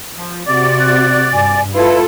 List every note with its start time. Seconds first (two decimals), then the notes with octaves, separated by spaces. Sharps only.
0.16 F3
0.47 C3 F#4 D5 D6
0.80 F#6
1.32 G2 G#5
1.74 E4 F4 A4 B4